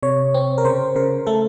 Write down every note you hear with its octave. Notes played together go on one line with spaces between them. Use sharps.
C3 C#5
C4
A#4
C#3 C5
C#3 A#4
A3 A4